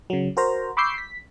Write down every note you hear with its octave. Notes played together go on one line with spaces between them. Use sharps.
C#3 F#3
F#4 A#4 C5 A#5
B5 C#6 D6 E6 G6 C7
B6